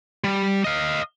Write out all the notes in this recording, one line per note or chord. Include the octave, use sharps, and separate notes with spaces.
G3
D#5 F5